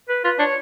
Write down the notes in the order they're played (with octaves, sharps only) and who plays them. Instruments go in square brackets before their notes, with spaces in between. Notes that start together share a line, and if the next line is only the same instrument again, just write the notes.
[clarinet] B4
[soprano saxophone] F4 [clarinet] B4
[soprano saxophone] D4 [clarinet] C#5